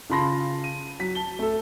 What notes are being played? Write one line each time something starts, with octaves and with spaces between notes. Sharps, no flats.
C#3 F4 A5 B5 C6 A#6
D#7
F#3 B6
A5 G7
A3 A4